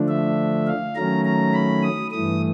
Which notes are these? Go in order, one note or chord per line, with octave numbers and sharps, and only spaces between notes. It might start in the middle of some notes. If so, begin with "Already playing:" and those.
Already playing: D3 F3 A3 D4
E5
F5
D#3 F#3 A3 C#4 A#5
A#5
B5
D#6
G2 E3 A3 D#6